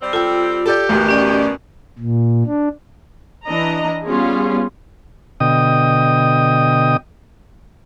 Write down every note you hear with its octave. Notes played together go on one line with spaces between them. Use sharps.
G3 C4
F4 A4 G5
G4 A4 D5
A1 D2 B2 D#3
C#4 D5
A#2
D4
E3 D4 D#5 A#5
G3 B3 C#4 F4 G#4
B2 D3 D#5 G5 D#6